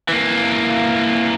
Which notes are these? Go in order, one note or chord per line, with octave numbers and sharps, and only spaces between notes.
E3 A#3